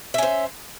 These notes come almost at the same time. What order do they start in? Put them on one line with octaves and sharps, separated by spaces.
E5 C#4 C5